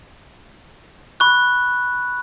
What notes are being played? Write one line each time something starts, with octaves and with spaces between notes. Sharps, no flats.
B5 C#6 F#6